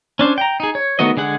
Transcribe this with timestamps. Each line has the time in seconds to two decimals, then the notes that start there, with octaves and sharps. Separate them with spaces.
0.19 C#4 D4 C5
0.38 G5 A#5
0.60 D#4 G#4
0.75 C#5
0.99 D#3 A3 B3 F#4 D#5
1.17 D3 G#3 G#4 F#5